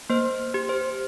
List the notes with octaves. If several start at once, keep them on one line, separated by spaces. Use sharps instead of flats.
A#3 C5
G4
C5